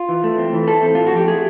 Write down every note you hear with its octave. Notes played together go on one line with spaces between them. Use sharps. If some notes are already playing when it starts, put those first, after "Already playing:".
Already playing: F4
E3
A3
C4
E3
A3 A4
C4
A2 F4
F#4
F3 G4
A3 G#4